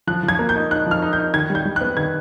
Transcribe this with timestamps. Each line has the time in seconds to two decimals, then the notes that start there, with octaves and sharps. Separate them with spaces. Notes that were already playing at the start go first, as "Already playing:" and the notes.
0.07 F3 F#6
0.23 F3
0.28 G#6
0.39 A#3
0.49 G6
0.55 D#4
0.71 D#4 F#6
0.86 F3 F6
1.02 D#4
1.13 G6
1.18 D#4
1.34 D#3 G#6
1.50 G3
1.55 G6
1.65 G3
1.76 F#6
1.81 B3
1.97 D#3 G#6